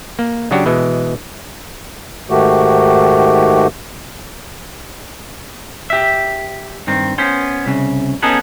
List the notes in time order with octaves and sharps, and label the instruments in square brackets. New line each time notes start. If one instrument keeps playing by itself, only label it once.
[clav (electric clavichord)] A#3
C#3 F#3 D4 F#4 G4
B2 E3 G#3
[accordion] G#2 D#3 A3 F#4 G4
[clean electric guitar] G4 E5
G2 D#3 C4
B3 C#4 C5
C2 C#3
B3 C#4 D#4 G#4 A4 B4